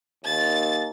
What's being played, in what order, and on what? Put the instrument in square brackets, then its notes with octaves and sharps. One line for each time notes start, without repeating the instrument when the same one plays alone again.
[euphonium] D#2 [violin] A6